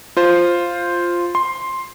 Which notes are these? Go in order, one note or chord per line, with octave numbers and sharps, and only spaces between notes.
F4 C5
C6